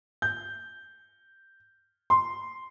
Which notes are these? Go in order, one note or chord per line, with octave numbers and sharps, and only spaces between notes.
G6
C6